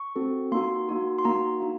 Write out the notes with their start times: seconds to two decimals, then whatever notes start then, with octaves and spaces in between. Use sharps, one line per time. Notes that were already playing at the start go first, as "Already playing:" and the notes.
Already playing: C#6
0.16 C4 F#4 A4
0.52 A#3 D#4 F#4 C6
0.89 A#3 D#4 F#4
1.18 C6
1.24 A#3 D#4 F#4 A#5
1.60 A#3 D#4